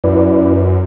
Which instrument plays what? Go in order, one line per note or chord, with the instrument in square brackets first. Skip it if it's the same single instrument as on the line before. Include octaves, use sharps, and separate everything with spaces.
[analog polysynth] F#2 [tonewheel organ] E4 B4 D5